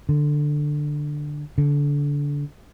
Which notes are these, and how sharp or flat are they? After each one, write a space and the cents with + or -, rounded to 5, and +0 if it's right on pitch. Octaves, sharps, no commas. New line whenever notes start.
D3 +10
D3 -25